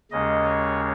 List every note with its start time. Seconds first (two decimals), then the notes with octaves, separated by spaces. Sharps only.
0.11 D#2 C#3 G#3 C#4 D#5
0.45 C#5